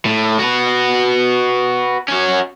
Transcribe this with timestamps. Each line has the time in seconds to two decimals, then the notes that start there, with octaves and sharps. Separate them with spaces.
0.05 A2
0.39 F#4 B4
2.08 C#4 F#4